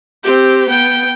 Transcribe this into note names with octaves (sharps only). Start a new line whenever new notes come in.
C4 G4
B3 G5